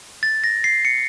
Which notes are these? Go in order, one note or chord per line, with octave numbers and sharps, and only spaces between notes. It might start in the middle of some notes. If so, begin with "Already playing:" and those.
A6
A#6
C7
C#7